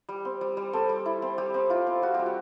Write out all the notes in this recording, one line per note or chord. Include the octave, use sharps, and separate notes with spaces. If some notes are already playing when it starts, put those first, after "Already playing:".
G3
C4
G3
G3
C4 A4
G3
E4
C4
G3 G4
C4
E4 F4
C4
G3 F#4
G3 G4
F#4